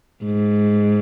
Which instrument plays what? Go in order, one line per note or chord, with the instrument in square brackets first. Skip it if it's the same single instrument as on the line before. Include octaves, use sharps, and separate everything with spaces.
[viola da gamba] G#2